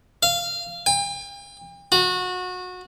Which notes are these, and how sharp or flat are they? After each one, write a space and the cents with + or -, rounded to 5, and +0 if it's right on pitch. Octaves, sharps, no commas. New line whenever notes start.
F5 -15
G5 +40
F#4 -25